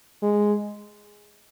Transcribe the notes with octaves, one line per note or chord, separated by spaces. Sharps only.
G#3